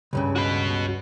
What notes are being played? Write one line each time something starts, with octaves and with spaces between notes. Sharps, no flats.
C#2 G2 C#3
F#4 B5